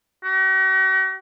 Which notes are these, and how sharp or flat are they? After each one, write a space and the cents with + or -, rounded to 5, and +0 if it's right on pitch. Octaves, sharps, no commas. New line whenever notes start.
F#4 +45